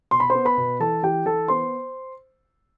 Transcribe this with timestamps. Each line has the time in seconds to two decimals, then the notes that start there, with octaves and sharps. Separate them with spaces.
0.11 B2 C6
0.20 B5
0.30 B3 C5 C6
0.45 B4 B5
0.57 B2
0.80 E3 A4 A5
1.03 E3 G4 G5
1.25 E3 A4 A5
1.48 B3 C5 C6